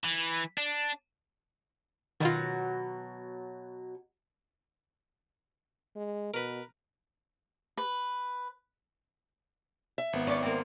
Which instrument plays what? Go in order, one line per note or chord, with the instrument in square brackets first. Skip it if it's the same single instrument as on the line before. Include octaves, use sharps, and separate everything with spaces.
[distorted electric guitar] E3
D4
[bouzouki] B2 D3 F#3 [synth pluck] D#3 F4
[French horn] G#3
[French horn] B2 [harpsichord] A#4 B4
[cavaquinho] B4
[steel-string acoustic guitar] E5
[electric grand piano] G#1 B3
[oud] C#4 D5
A#3 C4